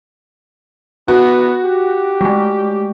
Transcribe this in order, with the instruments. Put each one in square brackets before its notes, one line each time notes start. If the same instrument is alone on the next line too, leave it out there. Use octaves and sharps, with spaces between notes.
[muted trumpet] B3 [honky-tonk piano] F#4
[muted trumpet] G4
[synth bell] G#3 A3